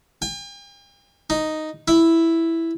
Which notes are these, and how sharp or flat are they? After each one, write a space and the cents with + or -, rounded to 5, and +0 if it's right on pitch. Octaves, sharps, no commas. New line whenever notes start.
G5 +45
D#4 +0
E4 +0